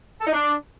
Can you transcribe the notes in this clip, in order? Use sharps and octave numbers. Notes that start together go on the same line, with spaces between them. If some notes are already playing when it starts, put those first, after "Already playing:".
A4
D#4
D4